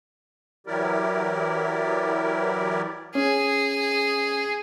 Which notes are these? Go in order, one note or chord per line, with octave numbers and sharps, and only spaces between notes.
E3 F#3 E4 G4 A#4 D5
C#4 G#4